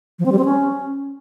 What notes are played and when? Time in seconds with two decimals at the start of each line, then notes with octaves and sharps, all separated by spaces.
0.19 F3
0.26 C4
0.32 G3
0.38 C4
0.45 C#4